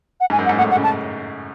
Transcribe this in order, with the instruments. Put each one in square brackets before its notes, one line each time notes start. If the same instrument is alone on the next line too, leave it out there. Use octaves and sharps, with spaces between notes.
[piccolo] F#5
[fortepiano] G#2 [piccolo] G#5
[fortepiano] F#2
[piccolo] F#5
[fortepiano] G#2
[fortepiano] A2 [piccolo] F#5
[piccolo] F#5
[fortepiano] C#3
[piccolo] A5